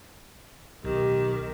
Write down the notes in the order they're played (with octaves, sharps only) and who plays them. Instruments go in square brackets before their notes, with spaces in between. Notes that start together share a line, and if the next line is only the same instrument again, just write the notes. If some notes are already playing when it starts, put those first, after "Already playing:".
[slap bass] B1 [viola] D#3 [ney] G4